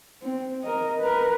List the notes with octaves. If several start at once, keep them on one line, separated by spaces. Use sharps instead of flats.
C4
A#4 D#5
A#4 B4